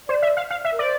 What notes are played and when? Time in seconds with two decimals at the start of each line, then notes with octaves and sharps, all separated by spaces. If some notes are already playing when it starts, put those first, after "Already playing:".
0.08 C5 D5
0.22 E5
0.37 F5
0.51 F5
0.65 E5
0.72 A#4
0.79 C5 D5